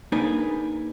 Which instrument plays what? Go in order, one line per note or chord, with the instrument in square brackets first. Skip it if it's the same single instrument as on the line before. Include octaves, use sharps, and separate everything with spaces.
[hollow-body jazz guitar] A#3 D4 D#4 G#4 A#4 B4